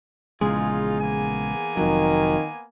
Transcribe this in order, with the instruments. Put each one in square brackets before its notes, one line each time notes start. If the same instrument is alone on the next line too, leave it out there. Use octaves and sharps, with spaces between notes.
[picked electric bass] A#1 C#3 G#3 [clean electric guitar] E2 G#4 [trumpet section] D#4 F4
[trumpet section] A#3 B3 G#5
[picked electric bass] F1 F#3 [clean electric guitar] F2 [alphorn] D#3